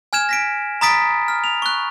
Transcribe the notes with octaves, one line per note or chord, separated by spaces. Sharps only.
G#5 F6 G#6 E7
A#6 B6 D7
A#5 B5 D#6 A6 B6 D7
F6
F7
C#6 F#6